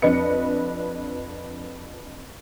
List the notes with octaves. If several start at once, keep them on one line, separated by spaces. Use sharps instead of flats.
F2 D4 B4 D#5 C#7